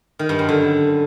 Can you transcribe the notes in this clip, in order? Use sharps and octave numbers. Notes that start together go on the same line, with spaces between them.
D#3
G2
F#2
D3